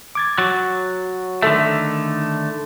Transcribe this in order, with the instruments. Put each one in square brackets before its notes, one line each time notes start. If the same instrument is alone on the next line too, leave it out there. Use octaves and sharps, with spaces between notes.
[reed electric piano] D6 G#6 A6
[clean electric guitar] F#3 [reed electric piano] A6
[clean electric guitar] D3 D#3 A3 [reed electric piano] A4 E5